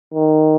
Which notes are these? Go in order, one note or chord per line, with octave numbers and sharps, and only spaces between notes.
D#3